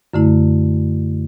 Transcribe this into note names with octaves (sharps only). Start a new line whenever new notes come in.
F#2 D3 A3 E4